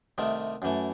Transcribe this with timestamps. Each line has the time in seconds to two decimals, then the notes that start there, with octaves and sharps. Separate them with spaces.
0.18 C2 C3 D#3 A3
0.62 F#2 E3 A3